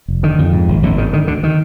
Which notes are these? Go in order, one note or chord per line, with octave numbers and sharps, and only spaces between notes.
F1
D3 D#3
F2
G#2
G#1
G#1 D3
G#2 D#3
D3 D#3
D2 D3
D#3